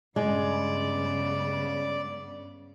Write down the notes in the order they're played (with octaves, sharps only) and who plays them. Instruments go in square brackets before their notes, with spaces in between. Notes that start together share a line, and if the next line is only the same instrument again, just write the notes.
[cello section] G2 C#3 B3 [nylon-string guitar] G#3 [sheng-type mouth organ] D5